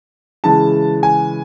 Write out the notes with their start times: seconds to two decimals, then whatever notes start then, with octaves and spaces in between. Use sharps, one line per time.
0.44 C#3 E3 G#3 A5
1.03 G#5